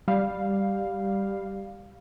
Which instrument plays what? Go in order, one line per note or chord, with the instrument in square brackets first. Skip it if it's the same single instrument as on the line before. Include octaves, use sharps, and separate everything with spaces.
[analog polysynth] G3 F5